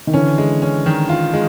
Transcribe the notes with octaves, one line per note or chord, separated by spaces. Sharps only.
D#3
D3 E3 C#4
G#3
C#4
D#3
F4
G#3